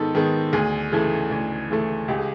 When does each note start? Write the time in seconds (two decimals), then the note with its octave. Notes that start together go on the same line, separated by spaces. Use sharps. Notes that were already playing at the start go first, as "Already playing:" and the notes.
Already playing: G#2 D#3 B3 A4
0.15 D#3 G#3 B3
0.53 D2 G#4
0.92 C#3 E3 A3
1.31 D2
1.70 C#3 E3 A3
2.08 C#2 G4
2.17 G#4